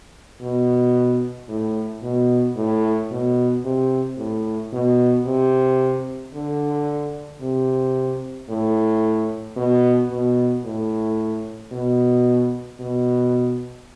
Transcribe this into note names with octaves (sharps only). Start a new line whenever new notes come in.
B2
A2
B2
A2
B2
C3
A2
B2
C3
D3
C3
A2
B2
B2
A2
B2
B2